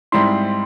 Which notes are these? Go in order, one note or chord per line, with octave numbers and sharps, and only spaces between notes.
G#2 G3 C4 E4 C6